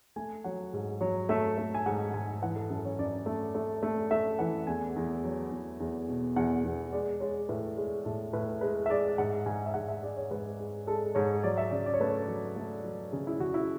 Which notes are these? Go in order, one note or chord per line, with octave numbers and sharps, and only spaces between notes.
A3 G#5
F#3 F#5
G#2
F#3
A3 E5
A3
G#5
G#2 F#5
G#2 G#5
E3 F#5
A4
F#2 A4
C#5
F#2 D5
A3
A3
A3
A3 E5
E3 F#5
E2 G#5
E2
F#3
E2
E2
B2
E2 F#5
E2
G#3 D5
G#3 C#5
A2 B4
G#3 G#4
A2 A4
A2 B4
G#3 B4
E5
G#3 D5
G#2 F#5
G#2 G#5
E5
G#2 F#5
E5
G#3 D5
C#5
G#2 B4
G#3
G#3 A4
G#2 C#5
F#3 D5
E5
C#3 D5
D5
C#5
A3 B4
C#5
F#3
A3
F#3
C#3 G#4
E4
C#3 F#4
E4